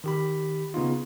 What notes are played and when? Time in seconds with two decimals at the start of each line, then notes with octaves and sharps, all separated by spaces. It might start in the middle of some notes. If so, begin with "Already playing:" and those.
0.04 D#3 G4 B5
0.74 C#3 B3 D#4 F4